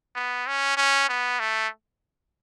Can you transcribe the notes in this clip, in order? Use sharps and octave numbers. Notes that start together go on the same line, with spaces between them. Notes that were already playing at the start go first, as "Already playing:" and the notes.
B3
C#4
C#4
B3
A3